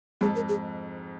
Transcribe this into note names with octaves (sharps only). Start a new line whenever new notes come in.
F2 G#2 G#4
A#4
G#4